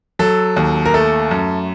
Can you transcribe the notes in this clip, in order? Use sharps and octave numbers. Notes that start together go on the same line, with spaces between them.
F#3 A4
D#2
A#4
A3 A4
F#2